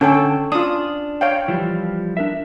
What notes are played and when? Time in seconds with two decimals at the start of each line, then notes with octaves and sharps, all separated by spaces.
0.01 D3 C#4 A4 G5
0.52 D4 F4 D#6
1.21 C#5 F5 G5
1.48 E3 F3 G3
2.17 D4 A#4 E5